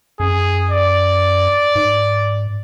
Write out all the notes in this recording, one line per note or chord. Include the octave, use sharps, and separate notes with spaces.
F#2 G#4
D5
G#2